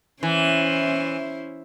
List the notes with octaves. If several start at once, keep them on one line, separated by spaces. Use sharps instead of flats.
E3 C#4 E4 C5